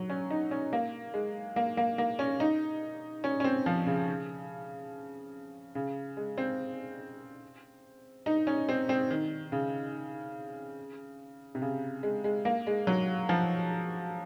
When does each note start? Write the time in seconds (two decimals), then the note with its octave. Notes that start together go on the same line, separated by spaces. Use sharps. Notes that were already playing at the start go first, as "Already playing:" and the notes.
Already playing: F#3
0.09 C#4
0.30 D#4
0.51 C#4
0.73 A#3
1.14 G#3
1.56 A#3
1.77 A#3
1.98 A#3
2.19 C#4
2.40 D#4
3.24 C#4
3.40 C#4
3.44 C4
3.66 F3
3.87 C#3
5.75 C#3
6.17 G#3
6.38 C4
8.26 D#4
8.47 C#4
8.69 C4
8.89 C4
9.11 D#3
9.52 C#3
11.55 C3
11.62 C#3
12.03 G#3
12.24 G#3
12.45 A#3
12.67 G#3
12.87 F#3
13.29 F3